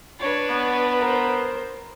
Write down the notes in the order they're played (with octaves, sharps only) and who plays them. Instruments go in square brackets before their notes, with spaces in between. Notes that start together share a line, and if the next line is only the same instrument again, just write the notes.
[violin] D4 B4 [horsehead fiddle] C#5
[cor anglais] B3
[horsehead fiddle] A#4 C5